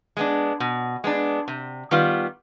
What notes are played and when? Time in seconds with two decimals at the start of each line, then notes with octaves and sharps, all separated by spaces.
0.17 G#3 B3 D4
0.60 B2
1.04 G#3 B3 D4
1.48 C3
1.91 D#3 G3 B3 F4